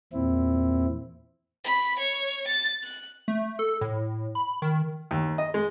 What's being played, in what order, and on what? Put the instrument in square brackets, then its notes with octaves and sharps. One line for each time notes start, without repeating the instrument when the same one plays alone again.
[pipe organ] E2 A#2 C4 E4
[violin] B5
C#5
A6
F#6
[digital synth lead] A3
A4
A2
B5
D#3
[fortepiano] D#2
D#5
G#3